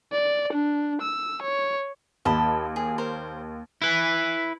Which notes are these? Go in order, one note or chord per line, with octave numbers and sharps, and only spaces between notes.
D5
D4
E6
C#5
D#2 D#5 A5 B5
G#4
A#4 C5
E4 B4